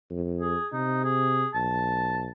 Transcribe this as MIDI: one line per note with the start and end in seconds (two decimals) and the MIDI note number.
0.11 0.56 41
0.40 0.67 68
0.73 1.44 48
0.73 1.03 63
1.04 1.47 68
1.54 2.28 35
1.54 2.32 81